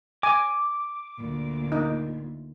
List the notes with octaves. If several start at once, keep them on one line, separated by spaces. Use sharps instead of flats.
G#5 D6
D2 A#2
D#4